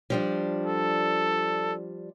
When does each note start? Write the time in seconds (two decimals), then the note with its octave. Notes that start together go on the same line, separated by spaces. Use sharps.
0.10 F3 G3 D4
0.66 A4